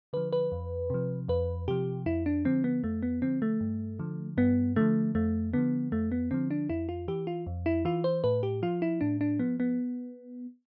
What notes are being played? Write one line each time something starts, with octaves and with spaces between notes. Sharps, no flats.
D3 F3 B4
B4
F2
C3 F3
F2 B4
C3 F3 G4
F2 E4
D4
D3 F3 C4
B3
F2 A3
B3
D3 F3 C4
A3
G2
D3 F3
G2 B3
D3 F3 A3
F2 A3
D3 F3 B3
F2 A3
B3
D3 F3 C4
D4
F2 E4
F4
E3 G4
F4
F2
E4
E3 F4
C5
A2 B4
G4
F3 F4
E4
A2 D4
D4
F3 B3
B3